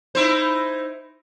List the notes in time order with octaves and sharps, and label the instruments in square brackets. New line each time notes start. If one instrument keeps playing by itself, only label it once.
[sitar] D#4 E4 C5